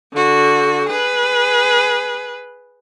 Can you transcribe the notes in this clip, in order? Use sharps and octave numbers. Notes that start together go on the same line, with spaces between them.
D3 F#4
G#4 B4